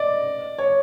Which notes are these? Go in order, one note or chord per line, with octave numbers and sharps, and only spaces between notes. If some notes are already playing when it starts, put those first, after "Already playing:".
Already playing: D5 D#5
C#5